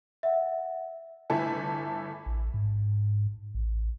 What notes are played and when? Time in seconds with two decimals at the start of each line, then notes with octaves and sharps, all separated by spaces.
0.23 E5 F#5
1.30 G1 A3 E4 A4 G#5
2.26 A1
2.54 G#2
3.54 A1